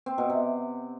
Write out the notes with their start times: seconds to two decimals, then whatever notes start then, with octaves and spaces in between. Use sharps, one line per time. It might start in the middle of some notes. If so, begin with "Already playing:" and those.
0.06 C4
0.18 B2
0.30 C3